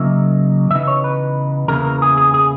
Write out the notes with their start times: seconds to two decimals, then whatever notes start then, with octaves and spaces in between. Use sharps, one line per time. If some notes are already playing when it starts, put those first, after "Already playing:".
Already playing: C#3 F#3 A#3 D#4 E5
0.70 C#3 E3 B3 D#4 E5
0.87 C#5
1.04 B4
1.68 E2 C#3 E3 A#3 E4 A#4
1.85 A#4
2.02 G#4
2.17 G#4
2.34 G#4